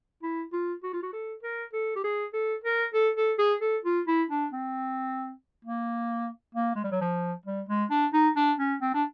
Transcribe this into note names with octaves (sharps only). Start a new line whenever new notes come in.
E4
F4
F#4
F4
F#4
A4
A#4
A4
G4
G#4
A4
A#4
A4
A4
G#4
A4
F4
E4
D4
C4
A#3
A#3
G#3
G3
F#3
F3
G3
G#3
D4
D#4
D4
C#4
C4
D4